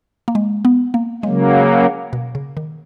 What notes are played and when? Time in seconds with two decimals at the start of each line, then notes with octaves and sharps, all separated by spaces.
0.28 A#3
0.35 G#3
0.65 B3
0.94 A#3
1.23 C#3 F#3 G#3 A#3
2.13 B2
2.35 C#3
2.57 D#3